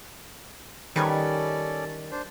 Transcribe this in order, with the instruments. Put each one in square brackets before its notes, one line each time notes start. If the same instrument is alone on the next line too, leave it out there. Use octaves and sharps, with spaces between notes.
[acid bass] D#3 [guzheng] G3 B4 C#5 [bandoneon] C#4 A4 D5
[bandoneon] D4 C5